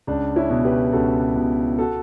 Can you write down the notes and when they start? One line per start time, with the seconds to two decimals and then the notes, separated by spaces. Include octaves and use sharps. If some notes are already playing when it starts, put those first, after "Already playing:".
0.07 C#2 D4
0.36 C#4 E4
0.50 B2
0.65 G4 B4
0.92 C#2 F#4 A4
1.36 B2
1.78 F#4 A4